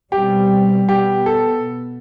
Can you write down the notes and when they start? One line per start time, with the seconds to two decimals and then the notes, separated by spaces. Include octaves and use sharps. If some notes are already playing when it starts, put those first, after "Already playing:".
0.11 B2 G3 C4 G4
0.88 B2 B3 G4
1.26 A4